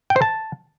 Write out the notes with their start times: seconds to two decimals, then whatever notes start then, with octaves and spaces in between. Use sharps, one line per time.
0.10 G5
0.16 C5
0.22 A5